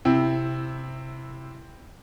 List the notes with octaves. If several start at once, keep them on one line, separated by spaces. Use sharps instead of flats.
C3 C4 E4